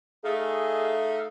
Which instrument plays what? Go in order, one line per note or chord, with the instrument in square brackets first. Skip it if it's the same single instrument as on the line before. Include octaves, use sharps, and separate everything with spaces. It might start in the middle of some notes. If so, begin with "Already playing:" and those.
[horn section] A3 [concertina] D#4 D#5 F5 [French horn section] G#4